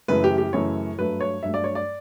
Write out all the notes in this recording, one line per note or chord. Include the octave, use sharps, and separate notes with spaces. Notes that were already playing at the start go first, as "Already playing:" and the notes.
F#2 C#3 E3 A3 B4
G4
G4
F#2 C#3 E3 A3 C#5
G2 F#3 A3 B4
C#5
G2 F#3 A3 E5
D5
C#5
D5